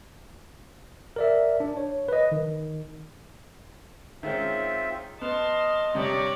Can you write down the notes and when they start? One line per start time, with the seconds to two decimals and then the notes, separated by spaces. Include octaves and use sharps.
1.16 A#4 D5 E5
1.60 D4
1.77 C#5
2.08 B4 D#5
2.32 D#3
4.23 D#3 G#3 C4 C#4 F4 E5
5.21 B3 D#5 A5 C6 F6
5.95 G2 C3 G4 C#5 D5 A#5